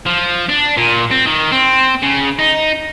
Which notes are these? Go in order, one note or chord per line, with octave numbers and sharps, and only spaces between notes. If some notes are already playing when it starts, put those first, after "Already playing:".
F3
D4
A#2
C4
D#3
C4
C#3
D#4